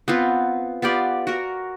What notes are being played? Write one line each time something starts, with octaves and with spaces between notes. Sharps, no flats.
B3 C4 F4
B3 F4 G4 D5
F#4 A#4